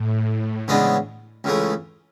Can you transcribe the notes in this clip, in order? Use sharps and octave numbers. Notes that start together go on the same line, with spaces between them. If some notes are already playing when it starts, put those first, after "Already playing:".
Already playing: A2
C#3 E3 G#3 B3 D4
C#2 C#3 E3 A3